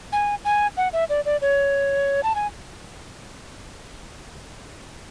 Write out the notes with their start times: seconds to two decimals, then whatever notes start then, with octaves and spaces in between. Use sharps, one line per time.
0.13 G#5
0.45 G#5
0.77 F#5
0.93 E5
1.09 D5
1.26 D5
1.42 C#5
2.23 A5
2.35 G#5